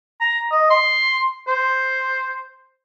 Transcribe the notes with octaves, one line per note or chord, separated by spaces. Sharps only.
A#5
D#5
C6
C5